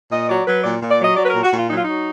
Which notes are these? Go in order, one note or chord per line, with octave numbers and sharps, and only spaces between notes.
A#2 D#5
F#3 D5
F#3 B4
A#2 D5
A#2
D5
F#3 D#5
F#3 D5
B4
A#2 A#4
F#4
A#2 F4
F#3 D#4
F4
F#3 D#4